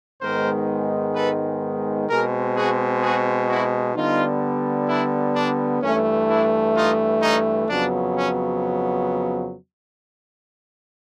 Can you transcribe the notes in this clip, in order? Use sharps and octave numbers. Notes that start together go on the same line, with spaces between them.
G#2 D#3 G#3 B3 A#4 C5
A4 B4
B2 G#3 C4 G#4 A#4
F#4 G#4
F#4 G#4
E4 F#4
D3 G3 B3 D#4 F4
D4 E4
D4
G2 E3 A3 C#4
D4 E4
D#4 F4
C#4 D#4
F2 C#3 F#3 B3 D4
C#4